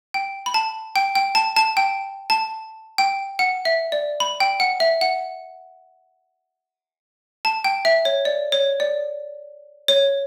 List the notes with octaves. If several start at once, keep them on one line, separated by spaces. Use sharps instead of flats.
G5
B5
A5
G5
G5
A5
A5
G5
A5
G5
F#5
E5
D5
B5
G5
F#5
E5
F#5
A5
G5
E5
C#5
D5
C#5
D5
C#5